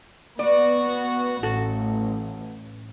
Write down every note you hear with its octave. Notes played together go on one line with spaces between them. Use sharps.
B3 F#4 D5
A1 F#4 A4